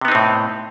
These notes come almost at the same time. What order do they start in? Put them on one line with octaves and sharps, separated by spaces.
C3 B3 D#4 C4 A2